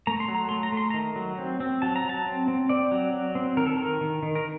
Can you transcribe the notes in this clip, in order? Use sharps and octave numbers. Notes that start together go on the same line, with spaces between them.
A3 A#5
C6
F#3
A#5
A3 C6
A#5
A3
C6
D#3 A#5
F#3
C4
C4
F#3 A5
A#5
F#3 A5
C4
C4
C4 D5
F#3
F#3
C4
D#3 A#4
A4
D#3 A#4
D#3
D#3
A#4